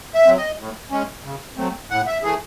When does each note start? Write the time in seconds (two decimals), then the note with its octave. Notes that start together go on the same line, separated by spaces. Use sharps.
0.14 E5
0.26 F#3 C4
0.36 D#5
0.58 A2
0.91 G#3 C#4
1.24 C#3
1.57 F#3 A3 C4
1.90 A2 F#5
2.07 E5
2.23 E3 A3 G#4